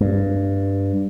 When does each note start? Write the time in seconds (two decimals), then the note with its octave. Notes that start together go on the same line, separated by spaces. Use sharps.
0.01 G2